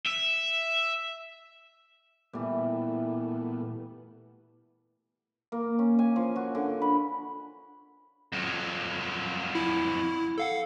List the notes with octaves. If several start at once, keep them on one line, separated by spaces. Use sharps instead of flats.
E5
A#2 E3 G3 A3 B3
A#3
C#4
G#5
F3
F#4
D3
B5
F2 F#3
E4
A4 F5 F#5